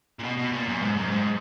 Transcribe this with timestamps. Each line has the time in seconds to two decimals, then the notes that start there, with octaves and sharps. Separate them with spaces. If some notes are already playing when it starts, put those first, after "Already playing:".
0.19 A#2
0.23 B2
0.37 B2
0.52 A#2
0.68 F#2
0.82 G#2
0.96 F#2
1.11 G#2